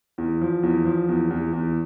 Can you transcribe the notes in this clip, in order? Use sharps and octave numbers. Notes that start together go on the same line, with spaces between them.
E2
F3
E2
F3
E2
E2
E2